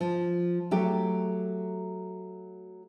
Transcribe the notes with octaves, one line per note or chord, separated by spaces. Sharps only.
F3
F#3 A3 G4